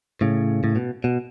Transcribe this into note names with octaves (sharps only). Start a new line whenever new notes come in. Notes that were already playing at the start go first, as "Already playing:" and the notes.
A2 C#3
A2
B2
B2